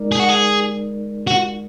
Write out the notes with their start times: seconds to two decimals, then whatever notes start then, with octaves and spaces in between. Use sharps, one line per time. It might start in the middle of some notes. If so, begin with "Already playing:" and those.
Already playing: G#3 D#4 A#4 D5
0.12 G#4
0.20 F#4
0.29 G#4
1.27 F#4